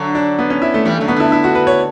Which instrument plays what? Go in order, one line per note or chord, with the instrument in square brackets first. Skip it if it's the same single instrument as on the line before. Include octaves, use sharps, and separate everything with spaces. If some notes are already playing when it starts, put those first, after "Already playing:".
Already playing: [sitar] D3 F#3
[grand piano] D4
B3
C#4
E4
A3
[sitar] E3 G3 [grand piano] A3
[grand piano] A3
[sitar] D3 F#3
[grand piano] B3
[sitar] D3 [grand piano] E4
[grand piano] E4
F#4
B4
C#5